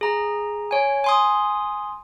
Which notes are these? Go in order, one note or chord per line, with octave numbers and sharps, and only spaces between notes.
G#4 A#5
C#5 G#5
G#5 C6 D#6